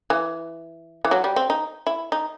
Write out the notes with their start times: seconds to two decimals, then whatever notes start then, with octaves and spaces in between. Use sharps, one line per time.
0.10 E3
1.05 E3
1.11 F#3
1.24 G3
1.36 C4
1.50 D#4
1.87 E4
2.12 D#4